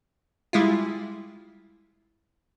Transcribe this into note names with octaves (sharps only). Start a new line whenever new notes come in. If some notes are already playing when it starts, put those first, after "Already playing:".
G3 G#3 E4 F4